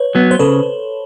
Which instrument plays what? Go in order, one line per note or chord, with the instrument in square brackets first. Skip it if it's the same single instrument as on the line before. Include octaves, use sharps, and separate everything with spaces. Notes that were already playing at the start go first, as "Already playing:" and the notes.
Already playing: [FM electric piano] B4 C#5
[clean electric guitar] F#3 B3
[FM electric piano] C5
[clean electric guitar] C#3 [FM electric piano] A4 B4